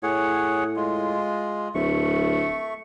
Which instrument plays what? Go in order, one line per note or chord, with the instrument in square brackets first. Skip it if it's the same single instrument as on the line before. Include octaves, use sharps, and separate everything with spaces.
[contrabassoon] A2 [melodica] G#4 C#5 F#5
[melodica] G#3 F4
[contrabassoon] D1 [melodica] A3 C#6